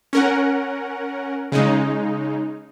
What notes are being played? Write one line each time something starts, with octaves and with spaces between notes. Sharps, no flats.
C#4 A#4 F#5
C#3 G#3 D#4